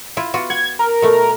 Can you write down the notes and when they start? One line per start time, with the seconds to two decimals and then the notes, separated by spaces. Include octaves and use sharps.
0.17 E4 F4
0.34 B3 F4 F#4
0.50 F#5 G#6
0.79 A#4
1.02 B2 A3